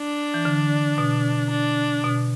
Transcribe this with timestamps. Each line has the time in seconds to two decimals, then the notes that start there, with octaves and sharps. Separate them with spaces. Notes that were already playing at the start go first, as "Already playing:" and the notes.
Already playing: D4
0.34 E3
0.45 D3
0.98 B2
1.51 D4
2.04 B2